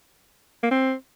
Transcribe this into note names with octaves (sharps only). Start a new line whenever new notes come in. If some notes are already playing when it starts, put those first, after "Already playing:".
A#3
C4